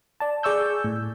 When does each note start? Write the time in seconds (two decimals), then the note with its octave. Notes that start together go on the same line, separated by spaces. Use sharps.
0.20 D5 A5
0.43 G#4 D5 C#6 E6 G6
0.84 A2